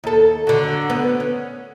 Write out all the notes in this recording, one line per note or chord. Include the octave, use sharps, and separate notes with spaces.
D#2 A4
D3 F#3
B3
C#4